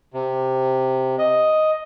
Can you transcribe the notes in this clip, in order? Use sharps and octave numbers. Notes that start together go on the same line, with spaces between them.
C3
D#5